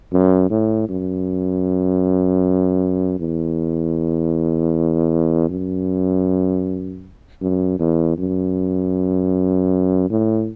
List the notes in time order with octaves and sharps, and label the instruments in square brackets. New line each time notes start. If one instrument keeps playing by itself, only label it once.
[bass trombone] F#2
A2
F#2
E2
F#2
F#2
E2
F#2
A2